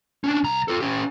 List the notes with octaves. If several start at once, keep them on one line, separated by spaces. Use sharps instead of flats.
C#4 D4
C2 A#5
F4 A4
C#4 G4